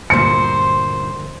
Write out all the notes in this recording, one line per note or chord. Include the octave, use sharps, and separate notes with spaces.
D2 G2 A#2 C5 C#7